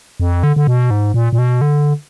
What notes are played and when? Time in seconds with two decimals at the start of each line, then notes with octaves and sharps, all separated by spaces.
0.20 F2
0.43 D3
0.56 D3
0.67 B2
0.91 G#2
1.14 A#2
1.33 A#2
1.38 B2
1.61 D3